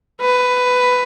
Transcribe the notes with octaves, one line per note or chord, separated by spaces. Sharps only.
B4